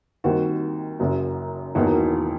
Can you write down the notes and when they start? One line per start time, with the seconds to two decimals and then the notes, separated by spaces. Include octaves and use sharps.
0.24 D#2 D#3 G3 C4 F#4
0.99 F#1 F#2 F#3
1.75 E1 D#2 D#3 F#3 B3